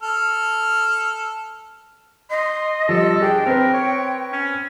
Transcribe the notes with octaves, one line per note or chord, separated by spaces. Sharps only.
A4 F6
D#5 C6
F3 G3 A4
D4 G#4 G5
C4 A#4 B4
C#5
C#4